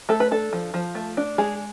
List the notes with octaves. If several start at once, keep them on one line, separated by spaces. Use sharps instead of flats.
A3 A4
B4
D4 A4
F3
F3
A3
D4
G#3 G#4